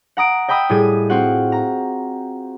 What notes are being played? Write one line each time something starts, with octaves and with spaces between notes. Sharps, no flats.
F#5 A#5 D#6 D7
D#5 G5 B5 D#6 E6
A2 G3 G#4 D#7
C4 F4 F#4 F#5
A#5